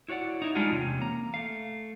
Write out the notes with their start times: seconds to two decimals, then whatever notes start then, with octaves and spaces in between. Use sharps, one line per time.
0.08 E4 F#4 C#5 D5 F#5
0.42 D#4 E4
0.55 G3 G#3 D4 D#4 F4 F#4
0.70 E2 C3 C#4
1.00 A#3 A#5
1.34 A3 F5